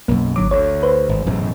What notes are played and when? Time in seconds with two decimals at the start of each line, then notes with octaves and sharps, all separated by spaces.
0.08 B1 F#2 A#3
0.36 G#1 D3 F#3 D6
0.51 D2 D3 C#5
0.83 B4 C5
1.09 G#1
1.26 E1 F#2 A2